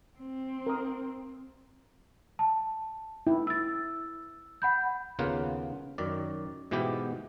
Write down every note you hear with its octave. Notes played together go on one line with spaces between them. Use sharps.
C4
A#4 D#6
A5
E4
E6 A6
F#5 B5 G6
D#2 C#3 A#3 B3 F4 F#5
F#2 D#3 D5
G#2 B2 E3 B3 G4